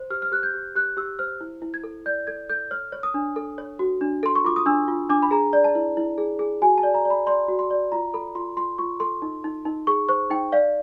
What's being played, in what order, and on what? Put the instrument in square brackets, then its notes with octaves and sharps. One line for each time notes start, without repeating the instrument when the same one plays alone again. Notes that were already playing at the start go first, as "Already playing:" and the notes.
Already playing: [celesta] C5
G4 F6
F6
G4 F#6
G6
G4
G4 F#6
G4 E6
C5 F6
E4
E4
G#6
A4
D5 G6
A4 G#6
A4 G6
C#5 F6
C#5
D#6
D4
A4
C#5
F#4
D4
A4 C6
C#6
F4 D6
D#6
D4 E6
F4
D4 D6
B5
G#4 A#5
D5
A5
E4
E4
G#4
G#4
F#4 G#5
A5
D5
A#5
D5
B5
D5 C6
F#4
C6
D5
F4 A#5
A4 B5
F4 C6
F4 C6
F4 C#6
A4 C6
D#4
D#4
D#4
G#4 C#6
C5 C#6
D#4 G5
D5 F5